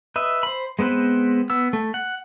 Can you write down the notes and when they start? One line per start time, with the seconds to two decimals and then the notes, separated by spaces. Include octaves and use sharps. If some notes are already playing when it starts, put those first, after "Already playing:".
0.16 B4 D#5 E5
0.43 C5 B5
0.79 G#3 B3 C4 B4 C5
1.50 B3 E6
1.73 A3
1.94 F#5